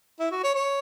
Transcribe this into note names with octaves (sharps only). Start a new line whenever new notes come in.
E4
F#4
C#5
C#5